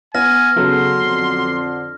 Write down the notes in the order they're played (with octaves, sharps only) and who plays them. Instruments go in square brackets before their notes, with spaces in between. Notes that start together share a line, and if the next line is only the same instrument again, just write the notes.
[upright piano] B3 [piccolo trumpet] G#5 [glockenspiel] F6 A#6
[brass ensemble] C#3 [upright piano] F#3 B3 A4 [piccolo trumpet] C6
[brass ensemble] F2 D3